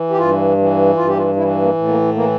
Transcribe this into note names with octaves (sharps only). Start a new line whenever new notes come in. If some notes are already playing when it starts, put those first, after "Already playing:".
Already playing: E3
G4
G2 F4
E3
G2 F4
G4
F4
E3 E4
A#3
A2
A#3
E3 A#3